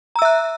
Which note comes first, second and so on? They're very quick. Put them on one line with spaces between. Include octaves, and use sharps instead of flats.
A#5 E6 E5 F#6